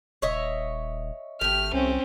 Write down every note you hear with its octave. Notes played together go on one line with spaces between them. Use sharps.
D#1 C#5 D#5 E5
G#1 A3 G4 F6
C2 C4 C#4